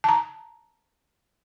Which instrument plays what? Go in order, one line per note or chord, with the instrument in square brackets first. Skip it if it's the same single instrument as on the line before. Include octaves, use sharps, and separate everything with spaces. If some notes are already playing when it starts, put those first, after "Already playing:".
[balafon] A5 A#5